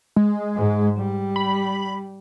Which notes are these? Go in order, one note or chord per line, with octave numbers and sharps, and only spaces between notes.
G#3
G#2
G3
B5